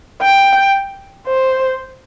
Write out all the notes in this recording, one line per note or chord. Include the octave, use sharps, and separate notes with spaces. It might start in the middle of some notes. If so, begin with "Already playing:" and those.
G5
C5